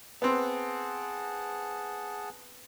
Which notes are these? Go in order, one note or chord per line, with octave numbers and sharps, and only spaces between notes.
B3 C4 G#4 F#5 A5